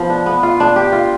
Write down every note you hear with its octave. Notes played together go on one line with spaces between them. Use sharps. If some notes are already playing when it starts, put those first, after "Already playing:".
Already playing: F3 B3
D4
B3
F4
D4
G4
F4